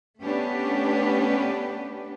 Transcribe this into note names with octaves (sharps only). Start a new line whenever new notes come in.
A3 B3 C#4 D4 G4 B4